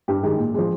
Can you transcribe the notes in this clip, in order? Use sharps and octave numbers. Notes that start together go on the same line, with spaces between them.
G2 G4
D#3 G#3
A#2
F3 G#3